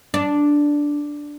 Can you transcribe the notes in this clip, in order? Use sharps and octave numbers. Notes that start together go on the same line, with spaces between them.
D4